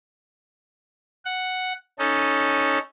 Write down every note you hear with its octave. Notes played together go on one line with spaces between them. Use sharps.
F#5
C#4 D#4 A4